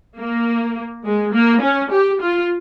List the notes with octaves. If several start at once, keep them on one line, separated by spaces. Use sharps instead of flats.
A#3
G#3
A#3
C#4
G4
F4